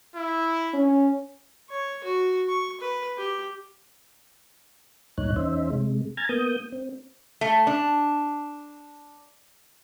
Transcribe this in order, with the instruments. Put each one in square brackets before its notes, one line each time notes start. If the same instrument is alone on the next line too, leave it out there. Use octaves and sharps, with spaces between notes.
[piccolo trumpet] E4
[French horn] C#4
[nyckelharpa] C#5
F#4
C#6
B4
G4
[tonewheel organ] D2 G2 A#2 D#4 C#5 F#6
E2 C#4 D#4 C5 E5
C3 G#3
G#5 A#5 F6 G#6 A6
A#3 B3 D#6 G6
C4
[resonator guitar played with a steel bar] A3
D4